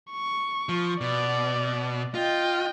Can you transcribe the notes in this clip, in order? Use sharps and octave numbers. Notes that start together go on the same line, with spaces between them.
C#6
F3
B2 D5
F4 D#5 G5